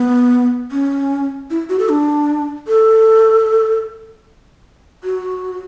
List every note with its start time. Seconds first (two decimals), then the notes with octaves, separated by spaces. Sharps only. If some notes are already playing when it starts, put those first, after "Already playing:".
Already playing: B3
0.72 C#4
1.50 E4
1.69 F#4
1.79 A4
1.89 D4
2.68 A4
5.04 F#4